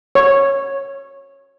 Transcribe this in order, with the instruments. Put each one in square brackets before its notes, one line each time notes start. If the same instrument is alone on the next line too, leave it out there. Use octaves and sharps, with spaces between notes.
[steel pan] C#5